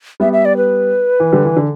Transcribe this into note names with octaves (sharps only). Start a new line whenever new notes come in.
G3 B3 E5
E5
D5
B4
E3
D3 G3
E3
D3